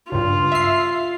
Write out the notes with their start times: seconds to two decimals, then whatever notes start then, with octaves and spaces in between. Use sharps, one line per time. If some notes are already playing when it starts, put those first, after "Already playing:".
0.12 C#2 G2 F4
0.52 E5 C7